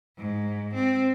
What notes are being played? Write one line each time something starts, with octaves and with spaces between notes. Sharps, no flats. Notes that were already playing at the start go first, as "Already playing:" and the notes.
G#2
C4